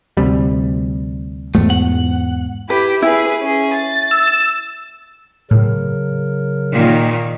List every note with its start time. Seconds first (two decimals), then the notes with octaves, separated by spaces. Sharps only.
0.17 D2 C3 G3
1.55 E2 G#2 A3
1.70 F#5
2.70 E4 G4 B4
3.02 E4 G#4 B4
3.40 C#4 G#4
3.73 A6
4.11 E6
5.51 A2 C#3 F#3 A#4
6.72 A#2 D#3